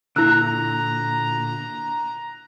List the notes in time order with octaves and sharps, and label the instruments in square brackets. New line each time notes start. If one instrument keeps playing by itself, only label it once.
[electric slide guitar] A#2 D3 [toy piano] E4 E6 [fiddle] A#5 [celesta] F#6